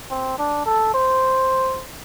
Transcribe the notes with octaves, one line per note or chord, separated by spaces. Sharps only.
C4
D4
A4
C5